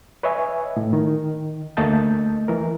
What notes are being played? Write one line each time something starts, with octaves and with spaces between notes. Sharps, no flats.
B4 C#5 D#5 E5 G#5
A2
D#3
D2 A3 A#3 D#5 A5 G6
E3 A#4